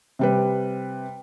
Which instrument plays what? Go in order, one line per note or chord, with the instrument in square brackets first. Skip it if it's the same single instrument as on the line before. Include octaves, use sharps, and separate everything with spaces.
[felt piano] C3 G3 B4